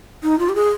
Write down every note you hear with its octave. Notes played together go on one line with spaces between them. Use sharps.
D#4
F4
G4
G#4